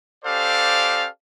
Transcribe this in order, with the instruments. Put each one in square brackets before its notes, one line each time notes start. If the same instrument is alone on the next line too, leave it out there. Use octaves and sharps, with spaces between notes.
[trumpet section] C#4 G4 A4 C5 D5 F5